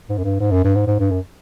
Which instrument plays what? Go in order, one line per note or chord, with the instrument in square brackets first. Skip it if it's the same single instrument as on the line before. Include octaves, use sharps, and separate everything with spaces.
[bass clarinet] G#2
F#2
G2
G#2
F#2
G2
G#2
G#2
G2
F#2